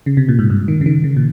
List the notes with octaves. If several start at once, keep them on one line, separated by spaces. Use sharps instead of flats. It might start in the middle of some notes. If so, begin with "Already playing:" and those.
C#3
C3
A#2
G#2
G2
D#3
C#3
D#3
C#3
A#2